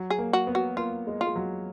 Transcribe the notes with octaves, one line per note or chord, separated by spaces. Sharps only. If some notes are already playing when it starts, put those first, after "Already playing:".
Already playing: F#3
G#4
A#3
F#4
B3
F#4
A#3 F4
G#3
F4
G#3
F#3